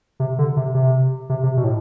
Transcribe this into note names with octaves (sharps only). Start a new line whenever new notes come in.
C3
D3
C3
C3
C3
C3
B2
A2